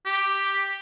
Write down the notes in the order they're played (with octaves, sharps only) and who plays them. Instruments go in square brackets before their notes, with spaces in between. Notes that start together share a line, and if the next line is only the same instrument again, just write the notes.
[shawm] G4